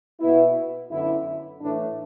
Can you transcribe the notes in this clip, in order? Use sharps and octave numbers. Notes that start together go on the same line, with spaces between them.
B2 B3 E4
F#2 D3 B3 E4
A2 E3 A3 D4